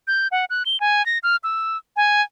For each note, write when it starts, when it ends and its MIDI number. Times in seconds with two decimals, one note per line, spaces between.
0.08 0.28 91
0.32 0.45 78
0.50 0.63 90
0.66 0.79 103
0.80 1.05 80
1.06 1.19 94
1.23 1.36 89
1.44 1.77 88
1.96 2.22 80